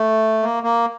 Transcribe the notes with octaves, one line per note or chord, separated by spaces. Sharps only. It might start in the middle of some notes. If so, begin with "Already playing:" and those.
Already playing: A3
A#3
A#3